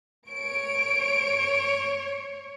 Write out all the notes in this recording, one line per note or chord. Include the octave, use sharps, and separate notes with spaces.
C#5 D7